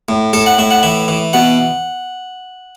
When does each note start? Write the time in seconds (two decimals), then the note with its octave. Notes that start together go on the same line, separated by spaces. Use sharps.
0.09 A2
0.33 A2 A4
0.46 F#5
0.58 A2 E5
0.71 F#5
0.83 E3 E5
1.08 E3
1.33 B2 F#5